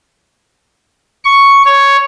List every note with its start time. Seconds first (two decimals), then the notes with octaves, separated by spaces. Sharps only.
1.25 C#6
1.65 C#5